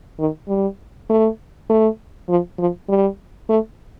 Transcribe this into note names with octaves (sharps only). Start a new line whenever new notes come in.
D#3
G3
A3
A3
F3
F3
G3
A3